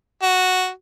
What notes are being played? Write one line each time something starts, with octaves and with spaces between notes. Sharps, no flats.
F#4